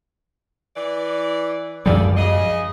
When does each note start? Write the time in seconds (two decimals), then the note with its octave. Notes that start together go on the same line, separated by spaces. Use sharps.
0.76 E3 D5
1.86 F#2 F3 G3 G#4 A4 D5
2.17 C#3 G#4 D#5